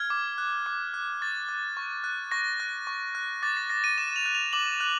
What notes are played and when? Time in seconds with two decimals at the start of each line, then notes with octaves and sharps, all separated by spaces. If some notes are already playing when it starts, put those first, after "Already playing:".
Already playing: F6 G#6
0.10 D6
0.38 F#6
0.66 D6
0.94 F#6
1.21 C#6 A6
1.49 F#6
1.77 C#6
2.04 F#6
2.31 C#6 A#6
2.60 F#6
2.87 C#6
3.15 F#6
3.43 D6 A6
3.57 A#6
3.70 F#6 A#6
3.84 D#7
3.98 D6 E7
4.16 F7
4.26 F#6
4.35 F7
4.53 D6 F#7
4.81 F#6